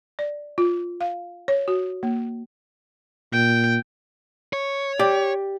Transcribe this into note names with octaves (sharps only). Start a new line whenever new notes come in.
D5
F4
F5
C#5
F#4
A#3
A#2 G5
C#5
G4 D5